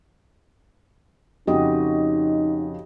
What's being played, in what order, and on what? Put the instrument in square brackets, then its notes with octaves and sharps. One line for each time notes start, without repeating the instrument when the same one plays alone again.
[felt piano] F2 C#3 [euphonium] D#4 [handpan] F#4 G4 D#5